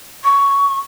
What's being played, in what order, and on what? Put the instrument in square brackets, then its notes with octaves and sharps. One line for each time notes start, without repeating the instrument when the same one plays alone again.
[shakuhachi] C#6